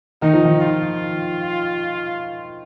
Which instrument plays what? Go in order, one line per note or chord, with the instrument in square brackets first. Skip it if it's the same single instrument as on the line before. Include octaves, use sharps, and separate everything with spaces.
[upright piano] D#3 [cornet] D#4
[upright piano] F3
D#3
[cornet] F4